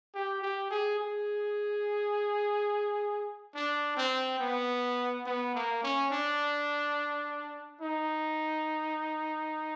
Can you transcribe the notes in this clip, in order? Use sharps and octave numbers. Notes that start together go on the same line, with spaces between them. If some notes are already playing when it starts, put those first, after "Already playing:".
G4
G4
G#4
G#4
D4
C4
B3
B3
A#3
C#4
D4
D#4